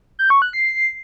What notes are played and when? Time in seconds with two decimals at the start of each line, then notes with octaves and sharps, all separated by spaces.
0.19 G6
0.30 C#6
0.42 F#6
0.53 C7